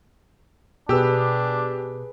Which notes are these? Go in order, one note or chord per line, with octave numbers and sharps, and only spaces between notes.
B2 D4 G4 G#4 B4 E6